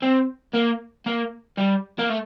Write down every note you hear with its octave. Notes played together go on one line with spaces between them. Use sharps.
C4
A#3
A#3
G3
A#3
A3